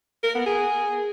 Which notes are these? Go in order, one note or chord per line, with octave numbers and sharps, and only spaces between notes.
A#4
B3
G#4